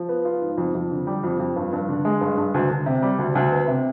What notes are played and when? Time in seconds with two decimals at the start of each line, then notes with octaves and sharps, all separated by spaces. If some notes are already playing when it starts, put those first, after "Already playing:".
Already playing: F3
0.09 B3
0.25 F4
0.41 G#2
0.58 F2
0.75 F2
0.91 D3
1.07 G3
1.23 F2
1.40 F2
1.56 G2
1.73 G2
1.88 D3
2.05 G#3
2.21 G2
2.37 G2
2.54 D2
2.70 D2
2.86 C3
3.02 G3
3.18 D2
3.35 D2
3.52 B3
3.68 C3